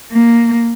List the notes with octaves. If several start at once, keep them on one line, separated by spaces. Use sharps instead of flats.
A#3